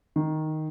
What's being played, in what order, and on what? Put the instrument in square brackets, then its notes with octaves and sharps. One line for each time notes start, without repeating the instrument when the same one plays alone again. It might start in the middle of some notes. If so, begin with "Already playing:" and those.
[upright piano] D#3